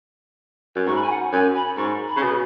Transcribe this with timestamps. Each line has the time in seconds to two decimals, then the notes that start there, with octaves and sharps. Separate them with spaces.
0.76 F#2
0.86 G#2 C#6
0.94 B5
1.02 G#5
1.09 F#5
1.32 F#2 G#5
1.55 B5
1.77 G#2 C#6
2.07 B5
2.16 C#3
2.22 B2